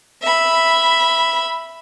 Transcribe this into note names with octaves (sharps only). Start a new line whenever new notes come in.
E5 B5